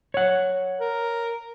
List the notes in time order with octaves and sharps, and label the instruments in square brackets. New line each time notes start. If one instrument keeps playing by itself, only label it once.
[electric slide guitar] C#5 F#5
[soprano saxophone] A#4